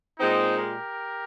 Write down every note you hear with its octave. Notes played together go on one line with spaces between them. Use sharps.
A#2 G#3 C4 D#4
G4 A#4